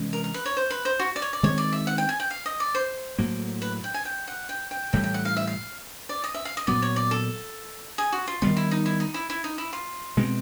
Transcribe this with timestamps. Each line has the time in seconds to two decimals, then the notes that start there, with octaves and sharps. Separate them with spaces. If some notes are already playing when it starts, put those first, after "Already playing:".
Already playing: C3 E3 G#3 C#4
0.13 A#4
0.24 A#4
0.34 B4
0.46 C#5
0.57 C5
0.70 B4
0.85 C5
0.99 F#4
1.16 D5
1.22 C#5
1.33 D5
1.43 D#3 G#3 C4 C#5
1.58 D5
1.73 E5
1.87 F#5
1.98 G5
2.09 G#5
2.20 G5
2.30 F5
2.46 D#5
2.60 D5
2.75 C5
3.18 A2 F#3 A#3
3.62 B4
3.84 G5
3.94 G#5
4.05 G5
4.28 F#5
4.49 G5
4.71 G5
4.93 A2 E3 G3 G5
5.04 G5
5.14 F#5
5.25 F5
5.37 E5
5.47 F5
6.09 D5
6.24 D#5
6.34 E5
6.45 F5
6.57 D#5
6.67 A#2 F#3 B3 D5
6.82 C#5
6.96 D5
7.11 A4
7.98 G#4
8.12 F#4
8.28 F4
8.42 D#3 G3 B3 F4
8.57 E4
8.71 D#4
8.86 E4
9.00 D#4
9.14 E4
9.30 E4
9.44 D#4
9.58 E4
9.73 F4
10.17 B2 G#3 C4